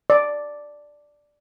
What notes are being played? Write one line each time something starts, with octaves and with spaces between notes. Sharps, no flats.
D5